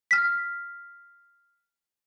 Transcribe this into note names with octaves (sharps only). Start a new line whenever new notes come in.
F6 B6